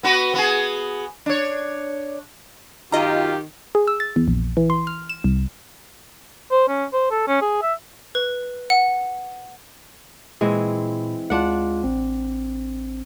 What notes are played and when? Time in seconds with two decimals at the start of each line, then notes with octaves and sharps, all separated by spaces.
0.03 B3 F#4 B4
0.34 B3 F#4 G#4
1.26 D4 C#5
2.92 F#2 D#3 F4 G4 D#5 A#5
3.75 G#4
3.87 E6
4.00 A6
4.16 E2
4.28 A#1
4.57 E3
4.70 C6
4.87 F6
5.09 E7
5.24 C2
6.51 C5
6.68 C#4
6.93 C5
7.11 A4
7.28 C#4
7.41 G#4
7.62 E5
8.15 B4
8.70 F#5
10.41 A#2 E3 G#3 C4 B5
11.30 D2 G#3 D4 F4 F#5
11.84 A1 C4